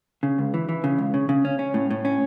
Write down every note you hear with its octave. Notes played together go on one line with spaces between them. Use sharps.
C#3
C#2
E3
E3
C#3
C#2
C#3
C#3
C#4
C#4
A2
A2
C#4